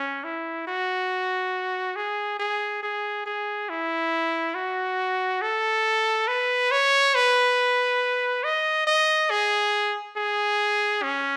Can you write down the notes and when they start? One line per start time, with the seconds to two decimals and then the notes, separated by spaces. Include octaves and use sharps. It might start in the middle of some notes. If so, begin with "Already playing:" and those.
Already playing: C#4
0.24 E4
0.67 F#4
1.96 G#4
2.39 G#4
2.83 G#4
3.26 G#4
3.70 E4
4.55 F#4
5.42 A4
6.28 B4
6.71 C#5
7.15 B4
8.44 D#5
8.87 D#5
9.30 G#4
10.16 G#4
11.03 C#4